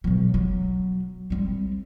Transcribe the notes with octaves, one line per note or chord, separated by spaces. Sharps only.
B2 F#3
F#3
G3 C4